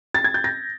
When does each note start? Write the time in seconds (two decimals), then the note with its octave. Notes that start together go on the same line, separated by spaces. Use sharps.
0.15 A6
0.24 G#6
0.34 G6
0.44 A#6